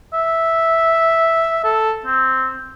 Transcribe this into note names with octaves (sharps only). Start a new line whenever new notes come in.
E5
A4
C4